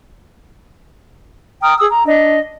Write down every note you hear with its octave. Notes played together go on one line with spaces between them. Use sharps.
G5 A#5 D#6 F6
G#4 D#6 E6
A#5
D4 D#5